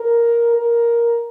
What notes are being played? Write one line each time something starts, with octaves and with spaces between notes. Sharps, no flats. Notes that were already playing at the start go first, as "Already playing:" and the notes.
Already playing: A#4
A#4